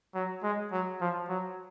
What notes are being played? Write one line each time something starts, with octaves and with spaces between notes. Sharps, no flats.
F#3
G#3
F#3
F3
F#3